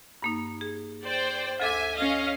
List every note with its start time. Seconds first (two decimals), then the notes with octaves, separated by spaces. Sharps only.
0.22 G2 A#3 D#4
0.61 G#4
1.03 C5 D5 G5
1.60 D2 A4 E5 G#5 D6
1.95 C#4 D#5 F5